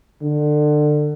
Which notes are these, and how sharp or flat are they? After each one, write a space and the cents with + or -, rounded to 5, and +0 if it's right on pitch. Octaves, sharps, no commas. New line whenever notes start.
D3 +25